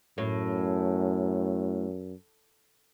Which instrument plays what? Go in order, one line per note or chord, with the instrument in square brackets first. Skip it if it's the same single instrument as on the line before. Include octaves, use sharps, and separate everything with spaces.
[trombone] F#2 [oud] A2